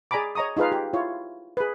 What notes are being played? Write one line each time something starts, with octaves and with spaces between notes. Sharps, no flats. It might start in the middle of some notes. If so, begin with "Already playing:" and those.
G#4 D5 G#5 A#5 B5 D6
C#5 D#5 A#5 C#6 D#6
D#4 F4 G#4 B4 F5
G4
E4 F4 C#5
G#4 B4